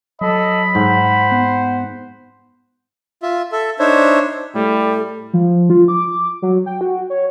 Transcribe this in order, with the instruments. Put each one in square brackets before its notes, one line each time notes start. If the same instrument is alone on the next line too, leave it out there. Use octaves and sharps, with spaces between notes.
[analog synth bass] F#3 [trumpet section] A4 D#5 [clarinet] B5
[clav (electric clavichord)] G#2 [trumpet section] C5 F#5
[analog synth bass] B3
[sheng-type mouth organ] F4 E5
A4 E5
D4 D#4 C5 C#5 E5
[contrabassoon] A2 [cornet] G3 [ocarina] A4
[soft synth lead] F3
F4
D6
F#3
G5
F#4
C#5